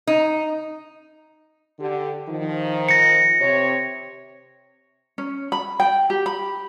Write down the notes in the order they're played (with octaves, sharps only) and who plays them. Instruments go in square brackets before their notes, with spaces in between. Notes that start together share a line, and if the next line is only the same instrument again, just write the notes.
[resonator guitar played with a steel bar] D#4
[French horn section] D3 G4
D#3 F3
[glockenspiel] A#6 C#7
[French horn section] C3 C#5
[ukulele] C#4
B5
G5
G4
B5